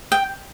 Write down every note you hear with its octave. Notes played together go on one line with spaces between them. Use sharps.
G5